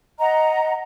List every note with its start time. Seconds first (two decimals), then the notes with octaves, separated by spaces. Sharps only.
0.19 D#5 F#5 A#5